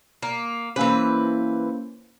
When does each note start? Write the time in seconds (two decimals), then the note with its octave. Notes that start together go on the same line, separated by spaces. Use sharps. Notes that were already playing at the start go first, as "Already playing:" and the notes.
0.22 A#3
0.76 E3 A#3 C#4 B4 C5